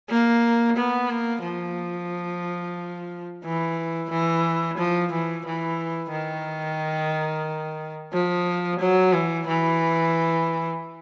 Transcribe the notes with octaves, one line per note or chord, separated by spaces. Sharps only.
A#3
B3
A#3
F3
E3
E3
F3
E3
E3
D#3
F3
F#3
E3
E3